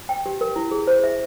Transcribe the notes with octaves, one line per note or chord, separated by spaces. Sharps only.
G5
G4
A#4
E4
G#4
C5
E5